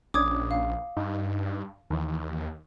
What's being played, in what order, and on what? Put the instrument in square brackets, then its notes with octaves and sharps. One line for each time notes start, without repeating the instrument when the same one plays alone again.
[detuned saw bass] A#1 [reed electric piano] C#4 D4 [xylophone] D6 D#6 G#6
[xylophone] F5
[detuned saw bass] G2 [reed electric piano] D#4
[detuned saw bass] D#2 [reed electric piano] D#3 E3